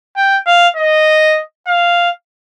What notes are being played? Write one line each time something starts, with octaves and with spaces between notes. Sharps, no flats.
G5
F5
D#5
F5